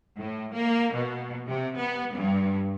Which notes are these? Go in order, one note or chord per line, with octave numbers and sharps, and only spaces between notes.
A2
A#3
B2
C3
B3
G2